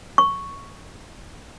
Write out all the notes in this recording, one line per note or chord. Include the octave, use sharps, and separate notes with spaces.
C#6